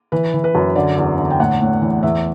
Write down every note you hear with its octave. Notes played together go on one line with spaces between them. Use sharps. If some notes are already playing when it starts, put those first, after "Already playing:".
E3 B4
E3
B4
F#2
D3 D5
E2
D3
G5
A2 F#5
A2
E3
E2 E5